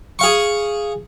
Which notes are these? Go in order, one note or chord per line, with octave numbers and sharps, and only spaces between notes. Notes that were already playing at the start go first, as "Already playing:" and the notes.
G#4 F5 C#6